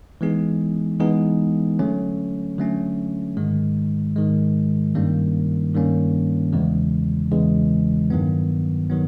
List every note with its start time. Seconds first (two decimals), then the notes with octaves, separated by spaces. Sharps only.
0.21 E3 G#3 B3 D#4 G#4
0.99 E3 G#3 B3 D#4 G#4
1.79 D3 F#3 A3 C#4
2.58 D3 F#3 A3 C#4
3.37 G#2 D#3 G#3
4.16 G#2 D#3 G#3
4.95 G2 D#3 G3 A#3 C#4
5.74 G2 D#3 G3 A#3 C#4
6.52 E2 C#3 E3 G#3
7.32 E2 C#3 E3 G#3
8.10 G2 D#3 F#3 B3
8.90 D#3 F#3 B3